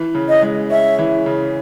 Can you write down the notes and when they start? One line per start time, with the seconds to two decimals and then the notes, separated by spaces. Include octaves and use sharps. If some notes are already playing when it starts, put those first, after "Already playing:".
Already playing: E3
0.15 C#3
0.29 D#5
0.42 G#3
0.70 C#4 E5
0.99 E3
1.26 C#3